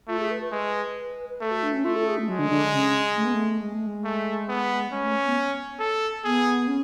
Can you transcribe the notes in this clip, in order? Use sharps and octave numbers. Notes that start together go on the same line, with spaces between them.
A3 F4
G#4
B4
B4
G#3 B4
B4
A3 A4
F#4
D4
C#4
A3 F4
A4
G#4
A3
F#3 G#3
D3
D3
C#3
A3
B3
A3
G#3
A3
G#3
A3
B3
G#3 C#4
A3
B3
A4
B3 G#4
C#4